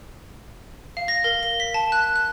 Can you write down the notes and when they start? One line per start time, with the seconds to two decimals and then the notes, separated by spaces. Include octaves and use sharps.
0.97 F5
1.08 A#6
1.24 A#4
1.43 G7
1.60 B6
1.74 A5
1.92 F#6
2.16 F#6